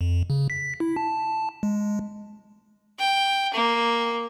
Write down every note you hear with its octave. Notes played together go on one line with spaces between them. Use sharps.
F2
C#3
B6
E4
A5
G#3
G5
A#3